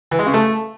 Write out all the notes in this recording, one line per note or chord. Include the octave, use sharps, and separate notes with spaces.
E3
G#3
C#3
A3